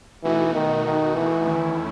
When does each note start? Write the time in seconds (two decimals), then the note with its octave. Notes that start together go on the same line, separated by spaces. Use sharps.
0.24 B2 E3 A3 D#4 F#4
0.54 D#3
0.85 D#3
1.15 E3
1.45 E2 D#3 A3 C#4 E4